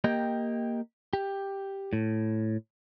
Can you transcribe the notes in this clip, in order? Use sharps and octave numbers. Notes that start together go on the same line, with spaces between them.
A#3 G4 D#5 G5
G4
A2